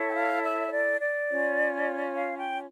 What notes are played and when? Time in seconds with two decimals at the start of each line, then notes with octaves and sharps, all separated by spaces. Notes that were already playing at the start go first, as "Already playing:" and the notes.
Already playing: E4 A4 C#5
0.11 G5
0.14 F5
0.44 E5
0.68 C#5
0.72 D5
1.00 D5
1.29 C#4 F4 C#5
2.16 F5
2.37 G5